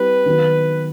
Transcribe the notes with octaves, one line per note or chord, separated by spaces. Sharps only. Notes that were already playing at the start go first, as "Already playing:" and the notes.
Already playing: G3 C4 E4 G4 B4
D#3 F#3 B3